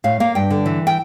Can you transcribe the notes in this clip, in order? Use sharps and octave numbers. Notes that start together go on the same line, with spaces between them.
A2 F5
A#3 F5
G2 G5
D3
E3
G5